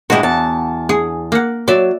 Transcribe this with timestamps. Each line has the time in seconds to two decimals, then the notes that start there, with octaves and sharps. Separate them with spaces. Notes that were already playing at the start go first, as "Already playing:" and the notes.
0.10 G2 G#3 E4 F#4 G4
0.23 E2 A5
0.89 G#4
1.32 A#3 F#5
1.68 F#3 D5 E5